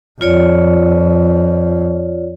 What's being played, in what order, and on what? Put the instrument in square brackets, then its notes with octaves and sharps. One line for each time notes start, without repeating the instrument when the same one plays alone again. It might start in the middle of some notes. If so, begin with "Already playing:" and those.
[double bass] F2 [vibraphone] F4 C#5 D5